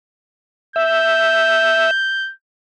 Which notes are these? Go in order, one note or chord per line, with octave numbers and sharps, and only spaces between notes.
E5 G6